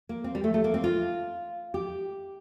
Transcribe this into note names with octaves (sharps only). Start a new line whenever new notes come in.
A#3
C4
G3
A3
A3
A#3
C4
F4
G4